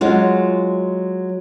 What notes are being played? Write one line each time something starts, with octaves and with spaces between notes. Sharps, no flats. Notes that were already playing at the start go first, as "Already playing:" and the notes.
F#3 G#3 F4